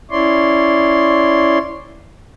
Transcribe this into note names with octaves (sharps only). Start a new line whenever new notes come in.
C#4 E4 C#5 D5 C6